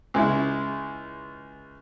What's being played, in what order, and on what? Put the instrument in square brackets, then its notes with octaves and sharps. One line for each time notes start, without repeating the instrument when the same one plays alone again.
[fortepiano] C#2 G#3 E4